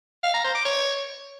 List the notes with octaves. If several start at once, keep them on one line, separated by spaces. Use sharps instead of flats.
F5
A#5
C5
D6
C#5